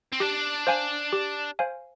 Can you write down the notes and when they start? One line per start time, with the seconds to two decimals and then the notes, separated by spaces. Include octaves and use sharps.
0.12 C4
0.20 D4 G4
0.67 C5 F5 G#5
1.13 G4
1.59 C5 F5 G#5